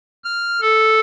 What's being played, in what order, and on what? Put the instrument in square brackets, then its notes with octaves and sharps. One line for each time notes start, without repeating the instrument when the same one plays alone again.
[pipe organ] F6
A4